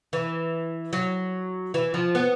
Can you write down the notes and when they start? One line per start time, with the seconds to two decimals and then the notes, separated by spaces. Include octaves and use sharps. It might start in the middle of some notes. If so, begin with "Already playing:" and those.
0.13 E3
0.93 F#3
1.74 E3
1.94 F3
2.15 B3